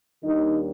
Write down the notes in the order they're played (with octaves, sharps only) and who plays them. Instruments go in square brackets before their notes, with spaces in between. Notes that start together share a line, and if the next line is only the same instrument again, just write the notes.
[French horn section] D#2 D#3 G3 D4 D#4